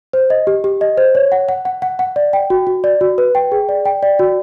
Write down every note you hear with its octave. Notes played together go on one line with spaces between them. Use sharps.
C5
D#5
G4
G4
D#5
C5
C#5
F#5
F#5
F#5
F#5
F#5
D5
G5
F#4
F#4
D5
F#4
B4
G5
G#4
D5
G5
D5
F#4